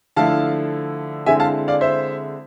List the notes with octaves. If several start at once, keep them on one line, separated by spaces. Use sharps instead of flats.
D3 F3 A3 E4 F5 A5
D3 G#3 C4 E4 E5 G#5
F5 A5
D5 F5
C5 E5